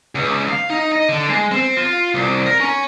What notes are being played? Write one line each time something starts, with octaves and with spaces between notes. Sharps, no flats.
C#2
F5
D#4
D#5
D3
G#3
C4
F4
C2
A#4
C#4